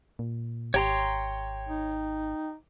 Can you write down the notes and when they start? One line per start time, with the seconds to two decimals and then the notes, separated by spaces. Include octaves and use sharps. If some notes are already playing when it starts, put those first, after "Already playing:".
0.19 A#2
0.74 G#1 G4 C#5 A#5 C6
1.69 D#4